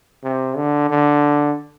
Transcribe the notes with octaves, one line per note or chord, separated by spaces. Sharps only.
C3
D3
D3